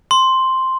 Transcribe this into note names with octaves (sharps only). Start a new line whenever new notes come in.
C6